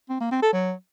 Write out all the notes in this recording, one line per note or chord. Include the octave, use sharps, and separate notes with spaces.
C4
A#3
C4
A4
F#3